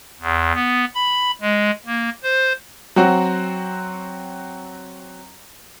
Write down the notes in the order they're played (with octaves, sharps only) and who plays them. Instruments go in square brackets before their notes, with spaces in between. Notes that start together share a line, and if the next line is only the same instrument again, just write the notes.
[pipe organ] E2
B3
B5
G#3
A#3
C5
[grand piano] F#3 C4 F#4